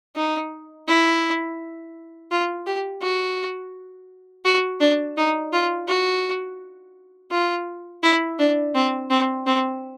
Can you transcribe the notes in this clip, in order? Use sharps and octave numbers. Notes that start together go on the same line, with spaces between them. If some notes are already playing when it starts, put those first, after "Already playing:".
D#4
E4
F4
G4
F#4
F#4
D4
D#4
F4
F#4
F4
E4
D4
C4
C4
C4